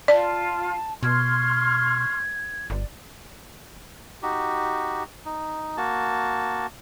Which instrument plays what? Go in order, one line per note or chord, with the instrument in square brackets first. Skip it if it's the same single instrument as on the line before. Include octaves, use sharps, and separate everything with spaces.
[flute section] F4 [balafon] D5 [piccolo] A5
[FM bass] B2 [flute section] C6 C#6 F6 [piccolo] G#6
[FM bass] G1 [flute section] D5
[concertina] D#4 F#4 G4
D#4
A#3 F#4 A5